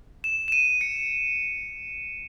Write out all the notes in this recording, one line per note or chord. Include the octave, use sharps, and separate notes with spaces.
E7
E7
D#7
C#7